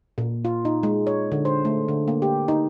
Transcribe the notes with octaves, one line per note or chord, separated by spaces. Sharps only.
A#2
F4
D#4
G#3
C#5
D3
C5
A3
D3
A#3
G4
D#4